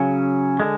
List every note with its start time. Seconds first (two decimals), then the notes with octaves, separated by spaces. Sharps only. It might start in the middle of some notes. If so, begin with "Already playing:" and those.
Already playing: C#3 F#3 C#4
0.60 D3 G#3